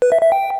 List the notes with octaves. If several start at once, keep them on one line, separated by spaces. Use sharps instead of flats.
B4
E5
E5
G5